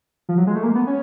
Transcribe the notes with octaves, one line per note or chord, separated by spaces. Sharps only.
F3
F#3
G#3
A3
A#3
B3
C#4